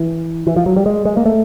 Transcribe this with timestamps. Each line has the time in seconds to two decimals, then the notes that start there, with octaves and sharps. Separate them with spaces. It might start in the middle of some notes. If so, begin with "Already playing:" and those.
Already playing: E3
0.47 E3
0.56 F3
0.66 F#3
0.76 G3
0.86 G#3
1.05 G#3
1.17 A#3
1.25 A3